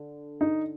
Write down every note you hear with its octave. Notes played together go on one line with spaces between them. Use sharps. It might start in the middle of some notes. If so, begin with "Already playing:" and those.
Already playing: D3
D#4